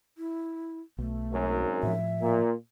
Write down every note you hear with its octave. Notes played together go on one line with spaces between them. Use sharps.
E4
B1 A3
G#1 F#2
A2 F3 E5
A#2